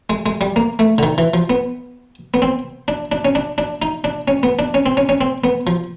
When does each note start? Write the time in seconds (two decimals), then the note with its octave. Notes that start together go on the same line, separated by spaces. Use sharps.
0.10 G#3
0.26 G#3
0.41 G3
0.56 A#3
0.79 A3
0.98 D3
1.03 D#3
1.18 E3
1.34 F3
1.50 B3
2.34 B3
2.42 C4
2.88 D4
3.12 D4
3.25 C#4
3.35 D4
3.58 D4
3.82 D#4
4.04 D4
4.28 C#4
4.43 B3
4.59 D4
4.74 C#4
4.86 C4
4.97 C#4
5.09 C#4
5.21 C4
5.44 B3
5.67 F3